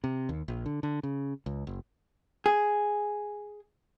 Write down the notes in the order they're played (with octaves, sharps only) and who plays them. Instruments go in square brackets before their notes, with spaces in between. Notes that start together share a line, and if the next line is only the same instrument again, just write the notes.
[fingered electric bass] C3
D#2
A#1
D3
D3
C#3
C#2
F#1
[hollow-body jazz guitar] G#4